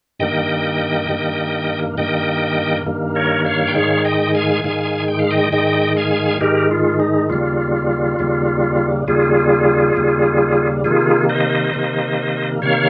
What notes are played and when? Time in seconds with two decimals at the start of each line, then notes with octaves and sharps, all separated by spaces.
0.20 G2 D#3 A#3 D#5 G5
1.09 G2 D#3 A#3
1.97 G2 D#3 A#3 D#5 G5
2.86 G2 D#3 A#3
3.15 A#4 C#5
3.45 C#5 F5
3.67 G5
3.75 G#2 D#3 G#3 C#5 F5
4.04 D#5 G5
4.34 F5 G#5
4.63 G#2 D#3 G#3 F5 G#5
5.08 G5
5.19 F5
5.31 D#5 G5
5.52 G#2 D#3 G#3 D#5 G5
5.97 F5 G#5
6.41 G#2 D#3 G#3 G4 A#4
6.71 F4
7.00 D#4
7.29 D#2 C#3 G3 A#3 F4
8.19 D#2 C#3 G3 A#3
9.07 D#2 C#3 G3 A#3 F4 G#4
9.96 D#2 C#3 G3 A#3
10.84 C3 D#3 A#3 F4 G#4
11.29 C5 D#5
11.74 C3 D#3 A#3
12.62 C3 D#3 A#3 C#5 F5